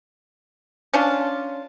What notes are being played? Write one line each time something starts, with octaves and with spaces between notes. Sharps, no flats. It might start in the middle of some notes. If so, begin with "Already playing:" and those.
C#4 D4 F4